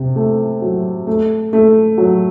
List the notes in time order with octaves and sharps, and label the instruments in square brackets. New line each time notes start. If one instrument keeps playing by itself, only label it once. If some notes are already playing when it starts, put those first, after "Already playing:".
Already playing: [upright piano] C3
A3
F#3
A3
A3
F#3